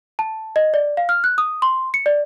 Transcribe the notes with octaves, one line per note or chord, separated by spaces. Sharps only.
A5
D#5
D5
F5
F6
F#6
D#6
C6
C#7
D5